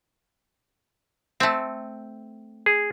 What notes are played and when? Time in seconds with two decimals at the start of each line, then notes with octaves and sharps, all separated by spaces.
1.40 A3 C4
2.66 G#4